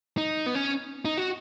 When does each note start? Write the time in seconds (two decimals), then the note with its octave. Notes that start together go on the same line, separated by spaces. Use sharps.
0.18 D#4
0.46 B3
0.55 C#4
1.05 D#4
1.18 F#4